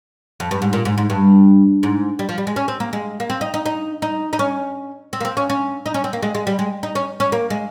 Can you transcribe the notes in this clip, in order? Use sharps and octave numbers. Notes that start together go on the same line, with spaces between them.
F2
G2
G#2
A#2
G#2
G#2
G2
G#2
G3
F3
G3
G#3
C#4
C4
A#3
G#3
A#3
C4
D#4
D#4
D#4
D#4
D#4
C#4
C4
A#3
C4
C#4
C#4
D#4
C#4
C4
A#3
G#3
G#3
G3
G#3
D#4
C#4
C#4
A#3
G#3